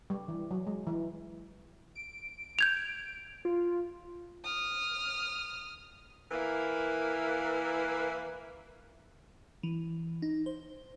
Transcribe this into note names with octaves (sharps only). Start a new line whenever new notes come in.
G3
E3
F#3
G#3
E3
D7
G6 G#6 F7
F4
D#6 F6
E3 A#3 E4 A#4 B4
E3
D#4
C5